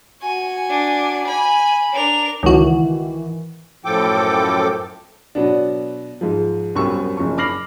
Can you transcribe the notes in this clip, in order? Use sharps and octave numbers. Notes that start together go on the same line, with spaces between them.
F#4 G#5
D4
G#5 B5
D4 A#4 F7
C#2 D#3 E3 F#4
F#2 A2 F3 A4 G5 D6
B2 F#3 B3 D4
G#2 F3
C2 F#2 B3 C4 C#6 E6
F#1 F3 C#6
B5 D6 F6 A#6 C7 F#7